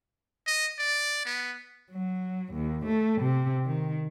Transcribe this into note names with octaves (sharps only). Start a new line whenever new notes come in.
D#5
D5
B3
F#3
D#2
A3
C3
D#3